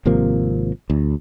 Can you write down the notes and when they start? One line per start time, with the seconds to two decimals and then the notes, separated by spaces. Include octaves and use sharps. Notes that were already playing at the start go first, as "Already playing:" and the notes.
0.05 G#1 C3 F3 A#3
0.90 D2